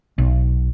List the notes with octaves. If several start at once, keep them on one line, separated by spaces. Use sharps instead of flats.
B1